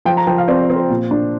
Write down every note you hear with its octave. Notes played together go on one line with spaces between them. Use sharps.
F3 G5
A#5
F3 G5
F5
C4 D5
D5
C4
C5
A#2
D4